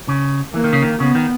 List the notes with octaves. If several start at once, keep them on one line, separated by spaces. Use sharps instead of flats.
C#3
E3 A#3
D#3
C#3
D#3
C#3 B3
D#3